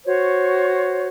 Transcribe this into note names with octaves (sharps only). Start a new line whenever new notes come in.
F#4 C5 C#5